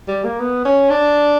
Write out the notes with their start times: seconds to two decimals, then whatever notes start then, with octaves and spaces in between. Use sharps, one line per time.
0.08 G3
0.24 A#3
0.40 B3
0.65 C#4
0.90 D4